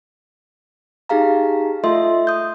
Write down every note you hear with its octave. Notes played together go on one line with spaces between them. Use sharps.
D#4 G4 G#4 F5 A#5
A3 F4 A4 D#5 E5 C6
D#6 G6